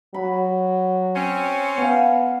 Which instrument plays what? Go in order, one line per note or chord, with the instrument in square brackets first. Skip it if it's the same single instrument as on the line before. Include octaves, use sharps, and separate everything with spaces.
[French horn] F#3 [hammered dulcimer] B5
[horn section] C4 C#4
[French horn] B3 [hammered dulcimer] F5 F#5 G#5